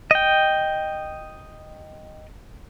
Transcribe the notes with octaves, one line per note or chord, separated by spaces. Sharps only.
D#5 G5